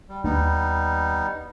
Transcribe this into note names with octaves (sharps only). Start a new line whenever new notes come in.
G3
D#2 G3 B3 D#4